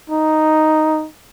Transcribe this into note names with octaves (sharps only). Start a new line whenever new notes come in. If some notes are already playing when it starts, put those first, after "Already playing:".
D#4